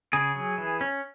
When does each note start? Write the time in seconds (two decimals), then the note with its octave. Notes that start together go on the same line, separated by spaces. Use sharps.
0.13 C#3 G#4
0.35 F#3
0.58 E3
0.81 C#4